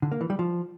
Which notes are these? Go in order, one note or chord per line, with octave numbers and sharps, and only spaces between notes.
D3
A#3
E3
G3
F3